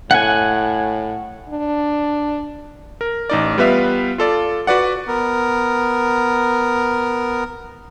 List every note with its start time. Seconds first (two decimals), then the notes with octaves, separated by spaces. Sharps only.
0.11 A2 F#5 G#5
1.50 D4
3.01 A#4
3.30 A1 D#4 D5
3.58 G3 B3 F4 B4 E5 F5
4.18 F4 A4 D5
4.67 F#4 B4 D5 F#5
5.07 B3 A#4